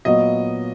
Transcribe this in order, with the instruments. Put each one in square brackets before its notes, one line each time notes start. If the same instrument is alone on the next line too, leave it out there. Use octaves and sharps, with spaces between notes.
[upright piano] A#2 F#3 B3 D#5